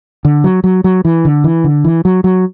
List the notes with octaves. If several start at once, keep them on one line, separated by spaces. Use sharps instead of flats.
D3
F#3
F#3
F#3
E3
D3
E3
D3
E3
F#3
F#3